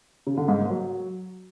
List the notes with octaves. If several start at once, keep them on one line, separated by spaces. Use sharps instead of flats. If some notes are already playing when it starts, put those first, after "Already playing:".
C#3
D3
G#2
A#3
F#3